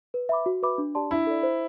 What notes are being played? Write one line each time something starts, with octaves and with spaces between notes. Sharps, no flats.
B4
E5 B5 D6
F#4
B4 E5 B5 D6
D4
G4 D5 A5 C6
D4 E4
A4 D5
C5